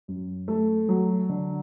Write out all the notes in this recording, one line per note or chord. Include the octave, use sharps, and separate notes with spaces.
F#2
A3
F#3
D3